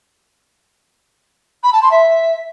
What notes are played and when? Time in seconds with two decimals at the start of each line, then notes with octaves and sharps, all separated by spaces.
1.63 B5
1.72 A5
1.81 C6
1.91 E5